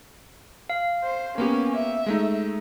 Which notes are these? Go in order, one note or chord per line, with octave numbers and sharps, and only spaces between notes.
F5
C5
A#3 B3 C#4 G4
E5
G#3 A3 D#4